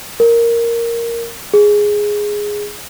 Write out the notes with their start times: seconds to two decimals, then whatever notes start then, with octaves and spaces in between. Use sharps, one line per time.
0.20 A#4
1.54 G#4